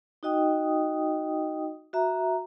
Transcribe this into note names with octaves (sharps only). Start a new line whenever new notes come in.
D#4 F#4 D#5 G5 D#6
F#4 E5 A#5